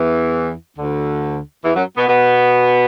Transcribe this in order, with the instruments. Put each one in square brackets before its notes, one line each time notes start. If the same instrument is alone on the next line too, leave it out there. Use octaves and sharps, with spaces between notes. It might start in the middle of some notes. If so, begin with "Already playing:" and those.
Already playing: [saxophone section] E2 E3
D2 D3
E2 E3
F#2 F#3
B2 B3
B2 B3